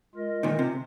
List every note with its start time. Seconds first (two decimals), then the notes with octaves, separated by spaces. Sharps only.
0.15 G#3 F4 A#4 D#5
0.43 A#2 D#3
0.59 C3